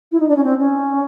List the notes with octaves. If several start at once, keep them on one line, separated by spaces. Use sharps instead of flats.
E4
D#4
D4
C#4
C4
C#4